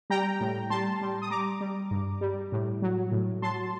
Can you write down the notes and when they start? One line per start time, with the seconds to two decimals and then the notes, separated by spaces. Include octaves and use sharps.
0.10 G3 G5 A#5
0.40 A2
0.70 G3 A5 C6
1.01 G3
1.22 D#6
1.30 G3 A#5 D6
1.61 G3
1.91 G2
2.21 G3
2.52 A2
2.82 F#3
3.12 A2
3.42 F#3 A5 C6